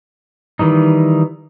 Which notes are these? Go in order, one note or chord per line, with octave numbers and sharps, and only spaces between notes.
D#3 E3 G3 D#4